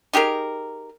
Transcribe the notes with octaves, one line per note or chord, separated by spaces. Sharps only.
D#4 G4 G#4 A#4